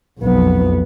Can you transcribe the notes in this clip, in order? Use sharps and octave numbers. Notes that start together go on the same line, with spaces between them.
B1 F2 B3